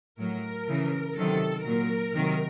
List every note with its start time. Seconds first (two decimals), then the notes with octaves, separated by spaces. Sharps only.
0.19 A2 F#3 A#4
0.68 C#3 E3
1.16 C3 D#3 F#3 A4
1.65 A#2 F#3 A#4
2.14 C3 D#3 F#3